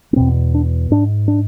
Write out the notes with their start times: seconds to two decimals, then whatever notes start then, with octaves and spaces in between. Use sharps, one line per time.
0.13 B3
0.16 E2 B2 C4
0.54 D4
0.91 G#2 D4
1.28 D4